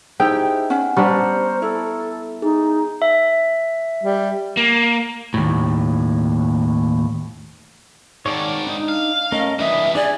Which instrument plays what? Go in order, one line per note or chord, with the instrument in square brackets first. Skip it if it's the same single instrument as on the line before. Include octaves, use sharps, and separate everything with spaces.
[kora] D#4 [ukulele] E4 G4 G5 [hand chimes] G#4 C5
[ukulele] C#4 [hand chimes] F#5
[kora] G3 B3 D4 [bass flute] C5 [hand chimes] A#5 C#6 F6
[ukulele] E4 [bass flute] A4
[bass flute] D#4 [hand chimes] G#4
[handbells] E5
[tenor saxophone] G3
[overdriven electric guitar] A#3
[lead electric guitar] D#2 A2
[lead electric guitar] G#2 D#3 [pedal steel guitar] C#5 D5 A5
[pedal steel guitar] D4 D#4
[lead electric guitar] F5
[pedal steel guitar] A3 C#4 A#4 [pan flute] D#5
[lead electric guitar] E3 G3 [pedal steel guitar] D4 B4 D#5 [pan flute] E5
[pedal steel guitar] D4 G#4 G#5 [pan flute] D5